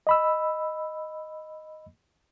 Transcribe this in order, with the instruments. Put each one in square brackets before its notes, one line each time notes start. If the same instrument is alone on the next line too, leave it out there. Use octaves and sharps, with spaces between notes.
[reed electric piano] D#5 B5 E6